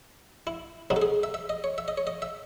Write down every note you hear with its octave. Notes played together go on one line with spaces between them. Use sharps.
E4
C2 C3 F#3 C4 D#4 F#4
A4
G#4
E5
E5
D#5
C#5
E5
D#5
C#5
D#5
E5